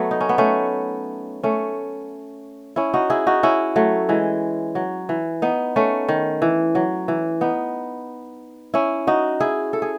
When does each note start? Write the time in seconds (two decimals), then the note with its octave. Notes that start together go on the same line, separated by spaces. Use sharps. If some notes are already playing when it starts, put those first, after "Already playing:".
Already playing: F#3 A3 B3
0.11 D#4
0.21 C#4
0.29 B3
0.38 A3 C#4
1.43 A3 C#4
2.76 C#4 E4
2.94 D#4 F#4
3.10 E4 G#4
3.27 D#4 F#4
3.43 C#4 E4
3.76 F#3 A3
4.09 E3 G#3
4.75 F#3
5.09 E3
5.42 B3 D#4
5.76 A3 C#4
6.09 D#3
6.42 E3
6.75 F#3
7.08 E3
7.41 B3 D#4
8.74 C#4 E4
9.07 D#4 F#4
9.40 E4 G#4
9.73 A4
9.82 G#4